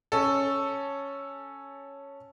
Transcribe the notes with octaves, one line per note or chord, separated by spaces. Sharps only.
C#4 A4